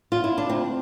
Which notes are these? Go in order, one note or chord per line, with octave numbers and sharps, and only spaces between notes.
F4
E4
D4
D2 C4